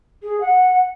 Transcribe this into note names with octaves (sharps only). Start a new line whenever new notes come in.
G#4
F#5